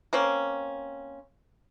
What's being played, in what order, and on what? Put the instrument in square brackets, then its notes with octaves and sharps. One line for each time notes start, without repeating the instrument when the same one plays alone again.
[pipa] A#3 C4 C#4